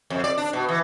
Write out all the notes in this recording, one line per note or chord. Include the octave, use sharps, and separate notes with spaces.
F2
D5
D4
B2
E3